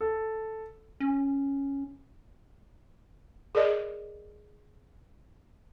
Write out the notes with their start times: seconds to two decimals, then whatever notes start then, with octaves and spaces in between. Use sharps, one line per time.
0.01 A4
1.00 C#4
3.55 G#4 A#4 D5 D#5